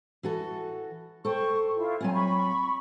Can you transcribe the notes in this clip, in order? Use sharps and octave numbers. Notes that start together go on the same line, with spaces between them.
E3 F#4 A4
A4 C5 G5 C#6
E4 F4
F#3 C4 F4 G#5
B5 C#6